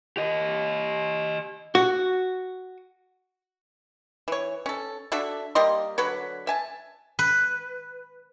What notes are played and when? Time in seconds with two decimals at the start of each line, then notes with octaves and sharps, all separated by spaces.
0.17 G4 D#5
1.75 F#4
4.28 E3 C#5
4.66 C#4 A4
5.12 D4 F#4 A4 E5
5.55 G3 A#3 D#5 C6
5.98 D3 F#3 B4 C#5
6.47 E5 G#5 A5
7.19 B4